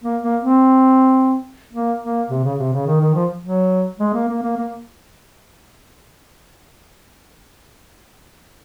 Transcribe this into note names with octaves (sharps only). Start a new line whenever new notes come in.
A#3
A#3
C4
A#3
A#3
C3
C#3
C3
C#3
D#3
D#3
F3
F#3
G#3
A#3
A#3
A#3
A#3